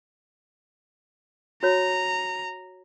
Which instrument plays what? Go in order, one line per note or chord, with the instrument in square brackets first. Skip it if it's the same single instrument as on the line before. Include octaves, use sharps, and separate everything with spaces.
[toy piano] F#4 C#5 [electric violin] A#5